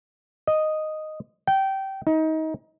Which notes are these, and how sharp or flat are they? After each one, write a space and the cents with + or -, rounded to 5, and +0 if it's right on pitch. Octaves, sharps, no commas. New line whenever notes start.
D#5 -5
G5 -20
D#4 +25